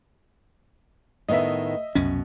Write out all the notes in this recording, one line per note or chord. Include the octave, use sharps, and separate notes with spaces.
A2 D#3 B3 D#5 E5
C2 F#2 B2 C#4